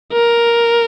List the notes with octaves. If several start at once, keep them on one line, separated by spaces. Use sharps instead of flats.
A#4